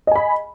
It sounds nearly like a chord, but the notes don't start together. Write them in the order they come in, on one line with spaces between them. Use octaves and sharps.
D#5 G#5 B5